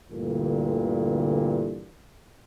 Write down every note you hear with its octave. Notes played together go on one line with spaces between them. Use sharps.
D2 G2 A#2 D3 E3